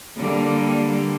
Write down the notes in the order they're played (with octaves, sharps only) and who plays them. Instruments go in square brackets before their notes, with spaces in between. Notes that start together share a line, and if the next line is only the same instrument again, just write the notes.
[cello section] D3 G3 A#3